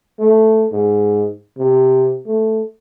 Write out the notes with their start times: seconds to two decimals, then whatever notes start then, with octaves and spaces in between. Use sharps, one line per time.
0.19 A3
0.72 G#2
1.57 C3
2.26 A3